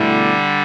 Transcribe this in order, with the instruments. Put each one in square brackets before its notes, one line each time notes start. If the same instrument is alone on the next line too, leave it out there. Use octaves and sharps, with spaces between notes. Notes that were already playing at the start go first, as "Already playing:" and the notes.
Already playing: [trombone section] E2 B2 A3 E4 [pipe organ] D3 G3